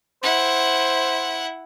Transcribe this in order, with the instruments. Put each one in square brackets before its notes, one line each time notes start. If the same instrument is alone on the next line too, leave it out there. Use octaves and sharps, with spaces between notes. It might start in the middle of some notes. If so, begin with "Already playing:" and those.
[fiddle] E4 F#5 [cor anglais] C5